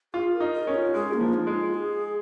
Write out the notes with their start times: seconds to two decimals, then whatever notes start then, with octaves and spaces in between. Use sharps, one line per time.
0.14 F4 G#4
0.34 A#4
0.40 D#4
0.54 A#4
0.67 C#4
0.74 F4
0.94 G#3 G#4
1.13 A#3
1.21 F3
1.34 D#4
1.47 G#3
1.54 F4
1.74 G#4